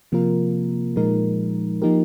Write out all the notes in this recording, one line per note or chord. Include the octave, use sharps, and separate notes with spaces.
C3 F3 A#3 F4 A#4
A#2 F3 G#3 D#4 A#4
F3 A#3 D#4 G4 A#4